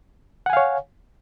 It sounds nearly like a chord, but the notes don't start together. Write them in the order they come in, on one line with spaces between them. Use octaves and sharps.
F#5 G#5 F5 C#5